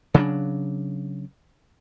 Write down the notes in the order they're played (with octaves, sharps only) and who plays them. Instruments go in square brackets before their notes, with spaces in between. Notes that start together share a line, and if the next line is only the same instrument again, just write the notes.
[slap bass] C#3 F#3 C4 D4